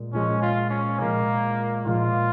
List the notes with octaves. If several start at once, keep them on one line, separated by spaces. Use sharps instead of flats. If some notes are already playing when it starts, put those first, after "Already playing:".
Already playing: A#2 G#3
A#2 F3 G#3 C#4
F4
C#4
A#2 F3 G#3 A#3
A#2 F3 G#3 F4